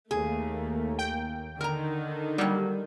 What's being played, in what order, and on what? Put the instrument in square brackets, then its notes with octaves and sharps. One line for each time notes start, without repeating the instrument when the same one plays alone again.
[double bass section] D#2 A#3 [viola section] A3 [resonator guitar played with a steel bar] G#4
[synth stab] G5
[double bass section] D3 [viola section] D#3 [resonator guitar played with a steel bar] A#4 A#5
[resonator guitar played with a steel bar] F#3 A#3 [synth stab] G3